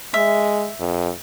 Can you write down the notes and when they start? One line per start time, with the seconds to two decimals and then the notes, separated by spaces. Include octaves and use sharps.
0.14 G#3 E5
0.80 F2